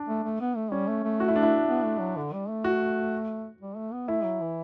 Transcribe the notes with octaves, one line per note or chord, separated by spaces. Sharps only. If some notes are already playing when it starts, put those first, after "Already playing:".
Already playing: D4
A3
A3
B3
A3
G3 C#4
A3
A3
F#4
E4
D4
E4
B3
A3
F#3
D3
G3
A3
F#4
G3
A3
B3
A3 E4
F#3
E3